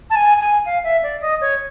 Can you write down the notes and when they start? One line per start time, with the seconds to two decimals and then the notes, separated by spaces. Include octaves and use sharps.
0.10 A5
0.16 G#5
0.41 G#5
0.66 F5
0.84 E5
1.03 D5
1.21 D#5
1.41 C#5